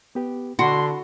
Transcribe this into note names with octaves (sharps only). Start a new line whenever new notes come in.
B3 G4 B4
D3 F#4 F#5 B5 C6